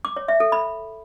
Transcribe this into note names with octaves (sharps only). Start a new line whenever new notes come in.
D6
C#5
E5
A4
B5